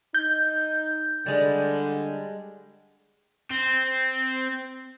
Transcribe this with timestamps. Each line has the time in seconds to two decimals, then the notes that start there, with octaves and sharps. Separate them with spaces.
0.14 D#4 G6
1.26 D3 G3 G#3
3.51 C4